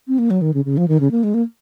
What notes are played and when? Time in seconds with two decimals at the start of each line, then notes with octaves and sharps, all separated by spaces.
0.08 C4
0.18 A#3
0.30 F#3
0.41 D#3
0.54 C#3
0.65 C#3
0.77 F3
0.88 D#3
1.00 C#3
1.11 A#3
1.23 G#3
1.34 A#3